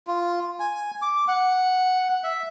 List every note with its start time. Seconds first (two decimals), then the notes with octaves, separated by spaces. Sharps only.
0.07 F4
0.60 G#5
1.02 D6
1.28 F#5
2.24 E5